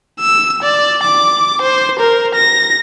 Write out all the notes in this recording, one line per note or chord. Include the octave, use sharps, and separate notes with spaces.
E6
D5
D6
C5
A#4
A#6